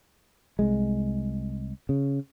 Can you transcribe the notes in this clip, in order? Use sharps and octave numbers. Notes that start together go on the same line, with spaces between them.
C2 G#3
C#3